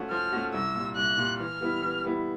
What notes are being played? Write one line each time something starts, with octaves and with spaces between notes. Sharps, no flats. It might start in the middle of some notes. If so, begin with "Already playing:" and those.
Already playing: F3 A3 C#4 F#4
F3 F6
A3 C#4 F#4
C2 E6
A#2 G3
C2 F#6
A#2 G3
E3 F6
G3 B3 E4
E3
G3 B3 E4